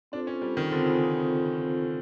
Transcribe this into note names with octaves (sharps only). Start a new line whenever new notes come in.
C4 D4 F4 A4 C5
C#4
G3
D#3
D3 C4 F4 A4 C5
C#3